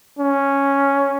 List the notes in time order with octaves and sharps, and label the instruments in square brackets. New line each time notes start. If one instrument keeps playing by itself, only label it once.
[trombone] C#4